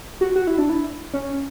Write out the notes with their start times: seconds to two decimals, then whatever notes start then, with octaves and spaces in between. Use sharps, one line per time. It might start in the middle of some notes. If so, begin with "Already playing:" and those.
0.21 F#4
0.36 F#4
0.47 E4
0.58 D4
0.70 E4
1.13 C#4